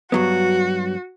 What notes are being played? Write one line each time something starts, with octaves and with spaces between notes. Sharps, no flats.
G2 F#3 B3 F#4